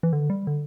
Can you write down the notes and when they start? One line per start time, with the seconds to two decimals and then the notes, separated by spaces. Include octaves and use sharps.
0.03 E3
0.13 D3
0.30 G3
0.47 D3